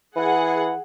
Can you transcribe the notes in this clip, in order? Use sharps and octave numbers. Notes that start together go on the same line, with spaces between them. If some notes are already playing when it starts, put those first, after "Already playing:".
E3 G#4 F#5